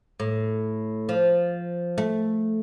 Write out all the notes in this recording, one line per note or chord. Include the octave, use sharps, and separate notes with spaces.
A2
F3
A3